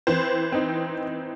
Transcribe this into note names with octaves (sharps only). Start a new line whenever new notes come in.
E3 C4 C5
C4 D#4